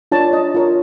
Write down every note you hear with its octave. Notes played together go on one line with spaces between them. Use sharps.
D4 F4 A#4 C#5 A5
D#5
F4 A#4 C#5